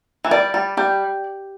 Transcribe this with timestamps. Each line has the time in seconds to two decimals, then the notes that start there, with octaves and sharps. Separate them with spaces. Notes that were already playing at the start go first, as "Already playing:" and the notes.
0.25 E3
0.31 G3 D5
0.54 G3
0.77 G3 G4